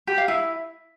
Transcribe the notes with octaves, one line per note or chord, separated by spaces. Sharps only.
G4
F5
E4